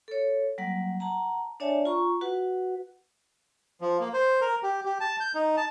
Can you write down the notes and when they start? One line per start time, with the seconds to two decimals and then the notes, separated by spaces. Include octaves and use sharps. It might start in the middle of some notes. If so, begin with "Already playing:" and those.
0.08 A4 C#5
0.58 F#3 G3 A#3 F#5
1.00 F#5 A5 A#5
1.60 D4 C#5 D5 E5 G#5 A5
1.85 F4 A#5 C#6
2.21 F#4 B4 F#5
3.81 F3
4.00 A#3
4.14 C5
4.41 A#4
4.63 G4
4.85 G4
5.00 A5
5.20 G6
5.35 D#4
5.57 A5